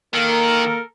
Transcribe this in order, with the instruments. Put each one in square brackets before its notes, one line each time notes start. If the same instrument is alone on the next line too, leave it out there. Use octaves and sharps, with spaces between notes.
[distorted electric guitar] D#3 [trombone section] A#3 [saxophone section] A4 A#4